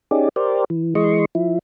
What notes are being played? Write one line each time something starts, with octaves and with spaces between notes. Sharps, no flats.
C#4 D#4 G4 G#4 D5
G4 A#4 C5 D5
E3
E3 G#3 D#5 C6 C#6
F3 E4